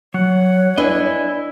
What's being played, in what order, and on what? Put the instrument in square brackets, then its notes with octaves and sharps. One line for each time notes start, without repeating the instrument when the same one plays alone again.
[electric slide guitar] F#3 [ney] C#5 [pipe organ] F#5
[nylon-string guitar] D4 B4 [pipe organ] E4 [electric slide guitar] D#5 G#5